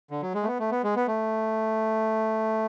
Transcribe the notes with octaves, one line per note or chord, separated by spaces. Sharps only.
D3
F#3
G#3
A3
B3
A3
B3
G#3
B3
A3